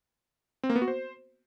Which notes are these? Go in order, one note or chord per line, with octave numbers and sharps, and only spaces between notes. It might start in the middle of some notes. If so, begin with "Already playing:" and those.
C4
A#3
B3
F#4
C5